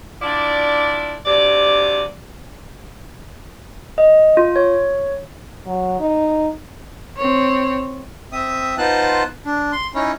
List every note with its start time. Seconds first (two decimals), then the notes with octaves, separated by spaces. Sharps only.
0.22 D4 E4 F4 D5
1.26 D2 C3 D5
3.98 D#5
4.37 F4
4.56 C#5
5.66 F#3
6.00 D#4
7.17 C4 C#5
8.32 C4 E5 D#6
8.78 B3 D#4 F4 C5 A5 F#6
9.45 D4
9.72 C6
9.95 C#4 D#4 E4 C#5